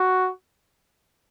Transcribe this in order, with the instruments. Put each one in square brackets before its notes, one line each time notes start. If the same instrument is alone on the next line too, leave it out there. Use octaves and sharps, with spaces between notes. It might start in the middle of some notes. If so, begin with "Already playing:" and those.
Already playing: [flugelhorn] F#4